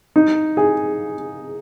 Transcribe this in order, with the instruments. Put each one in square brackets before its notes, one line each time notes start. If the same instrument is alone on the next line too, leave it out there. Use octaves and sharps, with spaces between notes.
[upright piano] D#4
G#4